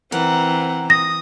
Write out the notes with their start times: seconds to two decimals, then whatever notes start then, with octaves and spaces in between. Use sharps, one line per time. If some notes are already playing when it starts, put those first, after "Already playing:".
0.12 E3 C4 A#4 F#5
0.90 D#6 A#6